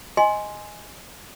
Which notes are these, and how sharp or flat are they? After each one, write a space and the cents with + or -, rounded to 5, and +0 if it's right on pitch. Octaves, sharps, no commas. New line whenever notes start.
D#5 +0 G#5 +0 C6 +5